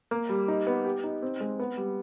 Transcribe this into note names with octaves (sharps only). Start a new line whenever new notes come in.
A#3
G3
D#4
B3
G4
D#4
C4
G#3
B3
G3